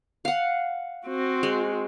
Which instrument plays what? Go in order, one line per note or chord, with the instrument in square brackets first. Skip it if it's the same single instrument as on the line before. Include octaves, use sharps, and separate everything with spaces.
[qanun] F5 F#5
[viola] C4 F#4
[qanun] G#3